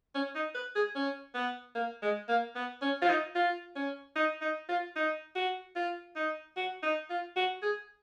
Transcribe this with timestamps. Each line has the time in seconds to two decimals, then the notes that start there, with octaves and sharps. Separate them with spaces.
0.15 C#4
0.35 D#4
0.55 B4
0.75 G#4
0.95 C#4
1.34 B3
1.75 A#3
2.02 G#3
2.29 A#3
2.55 B3
2.82 C#4
3.02 F4
3.09 D#4
3.35 F4
3.76 C#4
4.16 D#4
4.42 D#4
4.69 F4
4.96 D#4
5.35 F#4
5.75 F4
6.16 D#4
6.56 F#4
6.83 D#4
7.10 F4
7.36 F#4
7.62 G#4